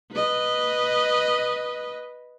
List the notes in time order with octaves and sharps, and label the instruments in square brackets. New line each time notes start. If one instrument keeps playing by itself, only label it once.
[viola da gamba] B4 D#5